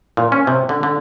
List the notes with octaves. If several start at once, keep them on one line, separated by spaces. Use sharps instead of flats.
A#2
C#4
C3
D3
D3